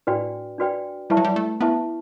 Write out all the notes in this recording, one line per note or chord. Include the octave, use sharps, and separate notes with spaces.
A2 D4 F#4 B4 D5 G5
D4 F#4 B4 D5 G5
G3 E4 B4 E5 A5 C#6
F#3
G3
A3
B3 E4 B4 E5 A5 C#6